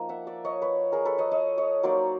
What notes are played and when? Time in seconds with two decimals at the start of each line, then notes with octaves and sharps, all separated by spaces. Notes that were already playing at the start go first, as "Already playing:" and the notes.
Already playing: F3 A#3 D#4
0.09 E5 F#5
0.27 D5 E5
0.45 C#5 D#5
0.62 B4 C#5
0.92 G#4 A#4
1.05 A4 B4
1.18 C#5 D#5
1.31 D#5 F5
1.58 C#5 D#5
1.83 F#3 A#3 D#4 C5 D5